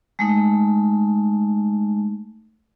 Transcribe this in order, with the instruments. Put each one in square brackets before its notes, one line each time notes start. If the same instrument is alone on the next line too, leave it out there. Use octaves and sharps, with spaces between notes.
[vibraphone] G#3 A3 D#4